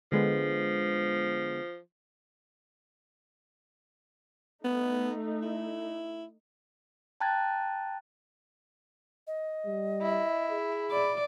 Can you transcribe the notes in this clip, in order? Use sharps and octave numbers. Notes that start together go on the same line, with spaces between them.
D3 F3 G#3 B3
A3 B3 D#4
E4
G5 A5 A#5 F#6 G#6 A6
D#5
G3
E4
G#4
D5 B5